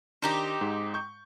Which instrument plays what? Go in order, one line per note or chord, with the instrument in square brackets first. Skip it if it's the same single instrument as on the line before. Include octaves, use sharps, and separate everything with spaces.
[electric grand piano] D#3 D4 [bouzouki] C4 D#4 G4
[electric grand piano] G#2
C#6 G6